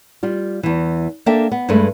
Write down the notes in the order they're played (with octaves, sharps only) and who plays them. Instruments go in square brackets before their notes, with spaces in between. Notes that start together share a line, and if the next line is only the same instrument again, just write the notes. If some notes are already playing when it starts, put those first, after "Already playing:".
[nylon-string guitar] G3 F4
E2 E3
A#3 D4 A4 E5 G5
B3
G2 G#3 A3 B4